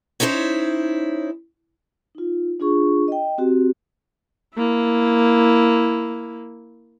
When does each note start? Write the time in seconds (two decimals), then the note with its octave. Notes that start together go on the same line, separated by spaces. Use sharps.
0.20 C#4 D#4 E4 G4 C5 C#5
2.15 D#4 F4
2.60 D4 F4 G#4 C#6
3.08 D#5 G5
3.38 C4 F#4 G4
4.54 A#3 E4